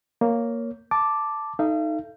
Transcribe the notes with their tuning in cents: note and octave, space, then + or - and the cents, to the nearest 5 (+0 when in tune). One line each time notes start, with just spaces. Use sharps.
A#3 +0 C#5 +10
A5 +0 D6 +0
D#4 +0 A4 +0 F5 -40